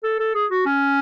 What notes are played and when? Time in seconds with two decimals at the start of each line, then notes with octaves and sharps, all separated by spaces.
0.03 A4
0.19 A4
0.34 G#4
0.50 F#4
0.66 C#4